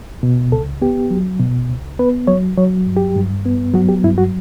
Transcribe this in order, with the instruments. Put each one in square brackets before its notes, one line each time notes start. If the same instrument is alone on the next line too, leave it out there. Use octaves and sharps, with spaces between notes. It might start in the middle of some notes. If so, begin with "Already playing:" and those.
[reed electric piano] B2
C#2 A4
B3 G4
F#3
B2
C#2
B3 B4
F#3 C#5
F#3 C#5
G2
G4
G2
B3
F#3 F#4
G4
G2 E4
F#4